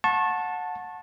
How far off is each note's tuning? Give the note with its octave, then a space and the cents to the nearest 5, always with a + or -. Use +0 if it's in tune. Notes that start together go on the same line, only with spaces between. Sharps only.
F#5 -25 A5 +0 C#6 -35